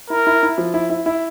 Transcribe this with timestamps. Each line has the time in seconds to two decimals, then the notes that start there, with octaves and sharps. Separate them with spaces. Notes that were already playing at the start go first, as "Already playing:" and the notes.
0.10 E4 A#4
0.27 E4
0.43 E4
0.58 F3
0.74 E4
0.90 E4
1.06 E4